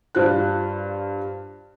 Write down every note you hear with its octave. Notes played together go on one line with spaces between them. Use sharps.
G2 F4 C5 F#6